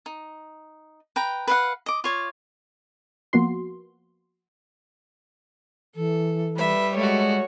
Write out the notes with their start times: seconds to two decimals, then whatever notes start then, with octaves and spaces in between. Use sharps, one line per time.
0.06 D#4
1.16 B4 G5 A#5
1.47 B4 F5 F#5
1.86 D#5 D6
2.04 F4 C#5 D5
3.33 F3 A#3 B3 F#4 C6
5.96 E3 A4
6.58 G3 B4 E5
6.96 G#3 A3 F#4 C#5